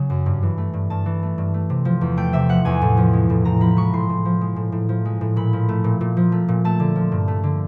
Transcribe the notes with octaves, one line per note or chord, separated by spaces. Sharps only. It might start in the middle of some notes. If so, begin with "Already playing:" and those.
Already playing: C#3 F#3
F#2
G2
E3
A3
G2
G2 A5
E3
A3
G2
A3
C3
F3
E2
A3 G5
C3 E5
F3 F#5
E2 G#5
A2
F3
G#3
A2
A2 A#5
F3 B5
G#3 C#6
A2 C6
A2
F3
G#3
A2
A2
F3
G#3
A2
A#2 B5
F3
A3
A#2
A#2
F3
A3
A#2
A3 A5
D3
F3
G2
A3
D3